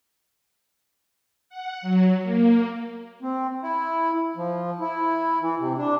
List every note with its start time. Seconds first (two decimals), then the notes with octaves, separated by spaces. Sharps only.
1.49 F#5
1.82 F#3
2.23 A#3
3.22 C4
3.62 E4
4.37 F3
4.81 E4
5.41 E3
5.59 C3
5.77 D4